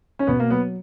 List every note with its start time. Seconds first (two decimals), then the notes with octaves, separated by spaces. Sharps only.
0.19 C#4
0.27 B2 B3
0.40 A#3
0.50 F#3 B3